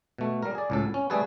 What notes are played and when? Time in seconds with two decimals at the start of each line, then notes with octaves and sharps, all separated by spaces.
0.18 B2 A3
0.43 G3 A#4
0.55 G#4 D5
0.70 C#2 A2 A4
0.94 C#4
1.10 G3 A3 G#4 A4 B4